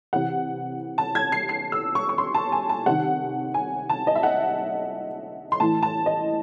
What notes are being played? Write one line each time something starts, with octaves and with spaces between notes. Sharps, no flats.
C3 E3 F#5
A5
G#6
C7
C7
E6
C#6
C#6
C6
A5
G#5
A5
C3 D#3 F#5
G#5
A5
D#5
E5
F#5
C6
A2 E3 A5
A5
D#5